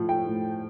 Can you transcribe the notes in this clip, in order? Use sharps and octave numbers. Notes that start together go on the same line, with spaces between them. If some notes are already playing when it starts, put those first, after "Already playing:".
Already playing: A2 F3
G5
A2